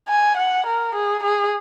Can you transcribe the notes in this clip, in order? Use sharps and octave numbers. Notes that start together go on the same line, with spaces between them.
G#5
F#5
A#4
G#4
G#4